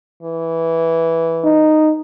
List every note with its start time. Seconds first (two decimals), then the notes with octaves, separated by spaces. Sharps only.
0.23 E3
1.44 D#4